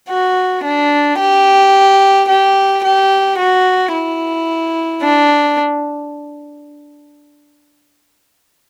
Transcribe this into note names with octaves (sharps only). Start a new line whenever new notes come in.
F#4
D4
G4
G4
G4
F#4
E4
D4